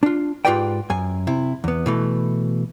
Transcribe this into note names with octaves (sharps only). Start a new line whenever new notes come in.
D4 F4
G#2 F4 G4 B4 D5 G5
F#2 G#5
C3 E4
E2 B3
B2 E3 A3